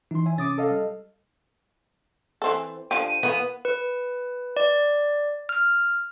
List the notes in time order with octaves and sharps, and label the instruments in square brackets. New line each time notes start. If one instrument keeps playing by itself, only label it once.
[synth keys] E3 [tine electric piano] D#4 C6
[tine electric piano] C#5 E5 G#5
[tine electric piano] C3 C#4 C#5 [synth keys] D6 D#6 A6
[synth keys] A4 D#5 F5
[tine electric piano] G3
[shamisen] E3 C4 A4
[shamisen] D3 F3 G4 [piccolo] D#7
[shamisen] E3 A#3 [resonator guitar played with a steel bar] B3
[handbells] B4
D5
F6